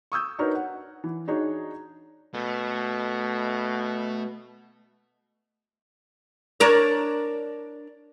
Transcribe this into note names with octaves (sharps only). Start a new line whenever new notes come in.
C#6 D#6 E6 G6
D4 D#4 F#4 A#4 B4 C#5
F#5
E3
D4 D#4 F#4 G#4 C#5
B2 A3
D4 A#4 C#5